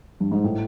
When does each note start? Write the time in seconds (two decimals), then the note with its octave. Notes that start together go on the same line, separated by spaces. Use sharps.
0.20 G2
0.31 G#2
0.44 A2